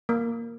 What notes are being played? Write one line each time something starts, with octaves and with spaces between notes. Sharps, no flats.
A#3